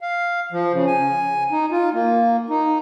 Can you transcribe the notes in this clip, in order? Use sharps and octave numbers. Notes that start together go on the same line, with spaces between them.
F5
F3
C#3
G#5
D#4
F4
A#3
D#4